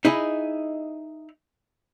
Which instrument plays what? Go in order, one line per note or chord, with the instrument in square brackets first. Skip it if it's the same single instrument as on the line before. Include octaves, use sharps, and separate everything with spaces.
[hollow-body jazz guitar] D#4 E4 G#4 D#5